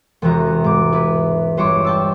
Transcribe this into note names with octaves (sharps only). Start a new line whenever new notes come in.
E1 E2 C3 E3 F#4 A#5
G#2 D6
E4 B4
G1 C5 C#5 D6
G5 A5 E6